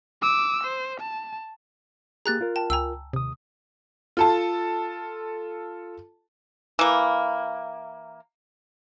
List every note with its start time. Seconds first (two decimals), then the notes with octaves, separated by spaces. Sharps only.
0.22 D6 E6
0.63 C5
1.00 A5
2.26 A#3 G4 G#4 A#5 F#6 A6
2.41 F4 A#4
2.56 G5 A5
2.70 C#2 G5 G#5 A#5 E6
3.13 D#2 C3 D#6
4.17 F4 A4 A5
6.79 E3 A#3